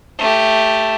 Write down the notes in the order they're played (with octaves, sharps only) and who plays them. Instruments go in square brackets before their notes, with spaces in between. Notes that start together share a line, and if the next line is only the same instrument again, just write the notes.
[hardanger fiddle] A3 G4